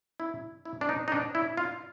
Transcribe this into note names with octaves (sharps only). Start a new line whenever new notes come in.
E4
E4
D4
D#4
D#4
D4
E4
F4